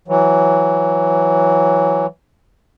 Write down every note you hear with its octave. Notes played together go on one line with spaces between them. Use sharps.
E3 F#3